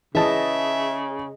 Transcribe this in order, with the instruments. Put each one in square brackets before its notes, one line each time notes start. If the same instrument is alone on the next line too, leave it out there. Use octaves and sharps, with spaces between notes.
[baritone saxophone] C#3 [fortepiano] E3 A5 [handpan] G#4 D#5 [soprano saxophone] E5